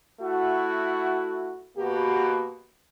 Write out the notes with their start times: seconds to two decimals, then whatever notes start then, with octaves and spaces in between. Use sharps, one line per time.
0.21 A3 E4 F#4
1.78 B2 A#3 B3 F#4 G4